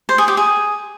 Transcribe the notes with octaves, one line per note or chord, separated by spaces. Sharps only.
C5
G#4
G4
G#4